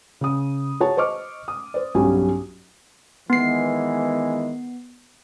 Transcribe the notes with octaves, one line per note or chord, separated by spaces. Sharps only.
C#3 D#6
F#4 G#4 C#5 A5
C5 D#5 C#6 D6 F6
D#6
C5 D5
B1 G2 F#3 C#4 G4 G#5
D#3 E3 G#3 B3 C7